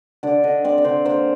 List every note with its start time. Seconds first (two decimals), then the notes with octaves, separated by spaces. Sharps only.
0.23 D3 D5
0.44 D3 D#5
0.64 C4 D5
0.78 D5
0.84 D3 C5
1.05 A#3 C5